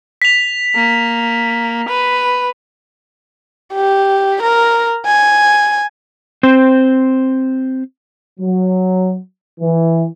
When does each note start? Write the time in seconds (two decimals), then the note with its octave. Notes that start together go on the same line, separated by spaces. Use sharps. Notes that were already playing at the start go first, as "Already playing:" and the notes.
0.22 B6 F7
0.76 A#3
1.89 B4
3.74 G4
4.43 A#4
5.06 G#5
6.43 C4 C5
8.39 F#3
9.60 E3